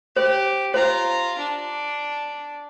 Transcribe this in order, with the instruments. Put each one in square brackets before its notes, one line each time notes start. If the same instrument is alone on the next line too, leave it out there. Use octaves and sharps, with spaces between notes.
[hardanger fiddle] G4 [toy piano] C5
[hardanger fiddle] F4 A#5 [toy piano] C5
[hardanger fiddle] D4